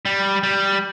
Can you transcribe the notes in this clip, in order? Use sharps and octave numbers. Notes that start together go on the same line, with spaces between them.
G3
G3